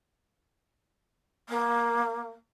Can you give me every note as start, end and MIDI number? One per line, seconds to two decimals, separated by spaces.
1.49 2.30 58